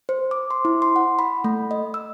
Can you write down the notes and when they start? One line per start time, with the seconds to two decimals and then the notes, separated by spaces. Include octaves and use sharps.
0.09 C5
0.31 D6
0.51 C6
0.65 E4
0.82 C6
0.96 F#5
1.19 B5
1.44 A3
1.71 D#5
1.94 E6